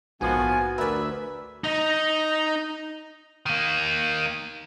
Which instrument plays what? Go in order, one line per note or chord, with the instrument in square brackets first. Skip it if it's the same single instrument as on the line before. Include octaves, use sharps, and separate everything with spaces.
[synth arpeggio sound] A#1 G#2 [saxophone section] D#3 F3 [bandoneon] B3 G#5 [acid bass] F#4
[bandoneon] D2 [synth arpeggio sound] A#4 D5 [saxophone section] B4 E5
[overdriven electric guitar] D#4 D#5
[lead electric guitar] D#3 A#3